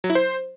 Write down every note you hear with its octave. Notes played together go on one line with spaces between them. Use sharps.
F#3
E4
C5